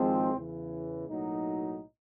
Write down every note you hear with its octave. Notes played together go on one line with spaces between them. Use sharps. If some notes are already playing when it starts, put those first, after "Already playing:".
Already playing: G#1 G#2 F3 G#3 C4
E2 C#3 E3
B1 A2 F#3 A#3 D#4